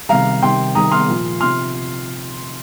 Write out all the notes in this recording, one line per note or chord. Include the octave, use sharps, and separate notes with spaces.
C3 D#3 G3 F5 A#5
C3 D#3 G3 G5 C6
C3 D#3 G3 A#5 D#6
C6 F6
A#2 F3
C3 F3 C6 F6